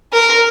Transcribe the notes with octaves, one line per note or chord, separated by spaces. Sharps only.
A#4